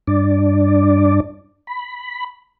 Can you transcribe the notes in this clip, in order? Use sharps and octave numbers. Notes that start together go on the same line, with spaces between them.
G2 D4 D5
B5